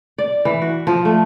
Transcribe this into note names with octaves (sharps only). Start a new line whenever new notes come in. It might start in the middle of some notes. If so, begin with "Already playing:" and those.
D5
E3
F#4
F3
A3